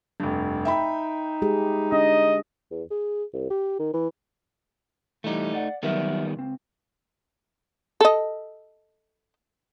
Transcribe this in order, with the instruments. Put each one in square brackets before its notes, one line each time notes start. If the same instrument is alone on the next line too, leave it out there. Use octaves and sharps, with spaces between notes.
[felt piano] F1 G2
[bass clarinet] D#4 [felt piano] E5 G5 B5
[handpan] G#3 G4 G#4
[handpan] D4 [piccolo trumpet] D#5
[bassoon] E2
G#4
C2
G4
D#3
E3
[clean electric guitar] E3 G3 [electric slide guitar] A3 D#4
[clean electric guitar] D5 F#5
[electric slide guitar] D#3 G3 B3 [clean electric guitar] F#3 A#4 E5
[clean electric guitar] C#2 C4
[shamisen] A4 D#5